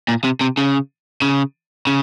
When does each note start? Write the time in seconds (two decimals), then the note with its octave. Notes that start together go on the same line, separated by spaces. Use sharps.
0.08 A#2
0.24 C3
0.41 C3
0.57 C#3
1.22 C#3
1.87 C#3